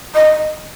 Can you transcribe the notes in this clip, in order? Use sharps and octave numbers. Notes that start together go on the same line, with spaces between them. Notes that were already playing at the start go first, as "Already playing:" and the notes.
D#5